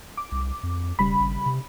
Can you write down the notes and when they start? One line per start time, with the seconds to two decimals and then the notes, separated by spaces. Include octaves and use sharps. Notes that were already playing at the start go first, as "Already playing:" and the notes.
0.17 D6
0.32 C2
0.63 F2
0.99 E1 C#3 G3 B5
1.20 G#1
1.46 C3